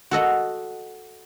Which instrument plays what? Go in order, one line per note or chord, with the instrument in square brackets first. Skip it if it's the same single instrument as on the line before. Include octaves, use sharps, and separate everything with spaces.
[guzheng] F#4 A4 D#5 F#5